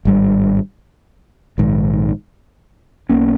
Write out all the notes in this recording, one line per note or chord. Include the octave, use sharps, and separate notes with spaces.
G#1 G2 G3
A#1 G#2 D#3
B1 B2 A#3 C#4